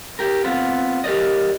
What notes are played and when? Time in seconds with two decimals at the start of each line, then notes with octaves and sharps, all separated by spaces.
0.19 G4 A#4
0.44 B3 C4 F4
1.04 G4 A#4 C5 D5 D#5